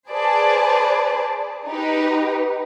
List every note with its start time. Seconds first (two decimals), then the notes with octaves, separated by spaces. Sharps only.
0.10 G#4 B4 C5 D5 A5
1.68 D#4 G4 B4